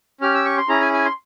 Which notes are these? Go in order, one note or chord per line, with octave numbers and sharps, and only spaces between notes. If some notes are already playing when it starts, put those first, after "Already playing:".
C#4 G4 F6
E6
C#6
C6
C#4 E4 G#4 A#5
G#5
G#5
C6